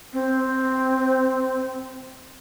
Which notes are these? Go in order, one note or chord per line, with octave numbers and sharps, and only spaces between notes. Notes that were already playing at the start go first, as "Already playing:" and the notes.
C4